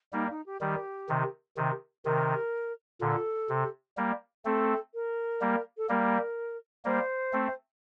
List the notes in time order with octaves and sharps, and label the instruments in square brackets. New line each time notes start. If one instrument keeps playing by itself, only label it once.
[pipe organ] G3 A#3 [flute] D#4
[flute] D#4
G4
[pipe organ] D#3 G3 [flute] G4
[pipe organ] C3 D#3
C3 D#3
[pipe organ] C3 D#3 [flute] A#4
[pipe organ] A#2 D3 [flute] A4
[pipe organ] C3
G3 A#3
[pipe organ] A3 C4 [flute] A4
[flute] A#4
[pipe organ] G3 A#3
[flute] A4
[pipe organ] G3 A#3 [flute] A#4
[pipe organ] G3 A#3 [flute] C5
[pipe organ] A3 C4